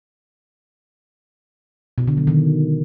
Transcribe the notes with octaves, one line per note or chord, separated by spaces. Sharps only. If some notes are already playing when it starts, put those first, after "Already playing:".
B2
D3
F#3
D#3